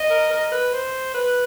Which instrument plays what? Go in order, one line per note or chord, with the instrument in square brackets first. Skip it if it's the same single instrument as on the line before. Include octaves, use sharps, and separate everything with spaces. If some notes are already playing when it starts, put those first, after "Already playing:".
Already playing: [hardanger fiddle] D#5
[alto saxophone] A#4
A#4
B4
C5
B4